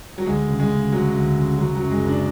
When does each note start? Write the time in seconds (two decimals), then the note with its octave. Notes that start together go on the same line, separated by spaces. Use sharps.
0.18 F#3
0.26 D2 G#3
0.48 C#3
0.59 G#3
0.70 C#3
0.92 D2 F#3
1.15 D2
1.37 C#3
1.58 C#3 F#3
1.75 F#3
1.81 F#2
1.91 G#3
2.02 F#1
2.08 D4